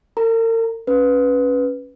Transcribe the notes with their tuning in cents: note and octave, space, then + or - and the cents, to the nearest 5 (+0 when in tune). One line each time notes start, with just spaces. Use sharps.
A#4 -40 A#5 +0
C#4 +0 B4 +0